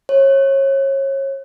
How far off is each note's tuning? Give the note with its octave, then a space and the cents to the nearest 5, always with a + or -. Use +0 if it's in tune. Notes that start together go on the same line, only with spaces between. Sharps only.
C#5 -30